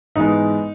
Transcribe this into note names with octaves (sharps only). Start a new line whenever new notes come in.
G#2 E3 G#3 B3 D#4